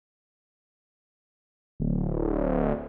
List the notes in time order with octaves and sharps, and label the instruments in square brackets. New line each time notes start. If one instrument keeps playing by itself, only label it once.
[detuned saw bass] D1